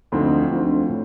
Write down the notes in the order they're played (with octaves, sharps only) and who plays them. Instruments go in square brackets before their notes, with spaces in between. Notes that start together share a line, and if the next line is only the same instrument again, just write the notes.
[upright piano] D2 D3 F3 C4 D#4
D2 D3 F3 C4 D#4
A2